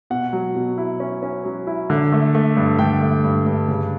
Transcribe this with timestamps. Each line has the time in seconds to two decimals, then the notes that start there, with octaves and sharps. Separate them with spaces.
0.10 B2 F#5
0.33 F#3
0.55 B2
0.78 E4
1.00 C#4
1.23 C#4
1.45 F#3
1.67 E4
1.90 D3
2.12 A3
2.35 A3
2.57 G2
2.79 D3 G5
3.02 A3
3.24 G2
3.46 G2
3.68 C#3